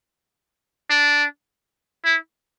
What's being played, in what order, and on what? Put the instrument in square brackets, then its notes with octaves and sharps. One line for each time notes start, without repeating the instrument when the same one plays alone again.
[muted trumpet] D4
E4